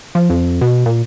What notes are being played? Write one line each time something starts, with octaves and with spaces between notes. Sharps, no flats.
F3
F2
B2
A#2